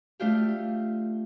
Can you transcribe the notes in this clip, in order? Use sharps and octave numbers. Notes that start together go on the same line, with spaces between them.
A3 D4 F4 G4